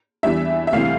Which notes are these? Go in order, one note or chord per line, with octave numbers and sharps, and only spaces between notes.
E2 E3 G3 D4 E5
E5
D2 C3 E3 G3 C4 F5